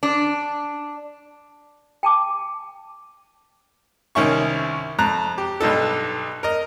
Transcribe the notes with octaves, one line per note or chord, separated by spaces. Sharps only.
D4
G5 A5 D6
C2 D#3 C#4 E5 C#6
F2 A#5 F#6
G4
B1 G2 D#4 A4
A#4 D#5